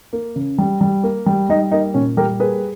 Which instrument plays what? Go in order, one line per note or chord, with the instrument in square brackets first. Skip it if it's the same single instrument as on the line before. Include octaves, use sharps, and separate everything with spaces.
[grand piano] A#3
C#3
G3
G3
A#3
G3
G3 D#4
A#3 D#4
A#2 C#4
G3 G4 A#4
A#3 G#4 B4